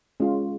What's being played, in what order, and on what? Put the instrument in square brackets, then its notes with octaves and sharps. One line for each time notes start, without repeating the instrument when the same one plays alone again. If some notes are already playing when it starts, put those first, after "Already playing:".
[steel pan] G#3 C#4 F4